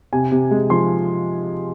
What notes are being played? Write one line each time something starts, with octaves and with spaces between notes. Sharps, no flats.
C3 G#5
C3
G#3
F3 C6